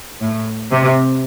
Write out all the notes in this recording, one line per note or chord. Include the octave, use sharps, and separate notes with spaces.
A2
C3